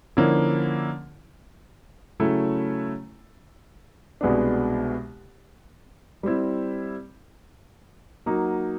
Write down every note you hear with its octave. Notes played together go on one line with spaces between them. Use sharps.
D3 F3 A#3 C#4 E4
C#3 F#3 A3 C#4 E4
C2 B2 G#3 B3 D4
G3 C4 E4
F#3 A#3 D#4 F#4